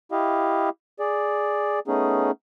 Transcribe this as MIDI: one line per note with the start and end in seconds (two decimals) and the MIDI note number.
0.12 0.69 64
0.12 0.69 67
0.12 0.69 75
0.12 0.69 77
1.00 1.79 68
1.00 1.79 74
1.88 2.31 57
1.88 2.31 59
1.88 2.31 61
1.88 2.31 63
1.88 2.31 68